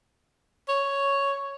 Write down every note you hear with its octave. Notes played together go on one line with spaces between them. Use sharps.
C#5